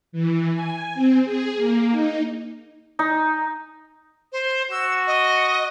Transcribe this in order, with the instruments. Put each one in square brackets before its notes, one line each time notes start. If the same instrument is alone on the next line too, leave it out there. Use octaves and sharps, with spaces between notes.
[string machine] E3
G#5
C4
G#4
A#3
D#4
[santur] D#4
[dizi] C5
[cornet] F#4 [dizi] E6
[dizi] D#5